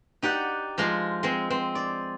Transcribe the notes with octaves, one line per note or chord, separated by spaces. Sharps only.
D#4 G4 D5 F#5
F3 G#3 F4
G#3 C4
C4
D5